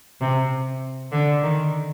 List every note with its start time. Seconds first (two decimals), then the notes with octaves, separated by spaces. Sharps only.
0.21 C3
1.12 D3
1.43 D#3